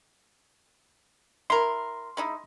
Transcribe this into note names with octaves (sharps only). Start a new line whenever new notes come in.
E4 A#4 C6
G#3 D#4 E4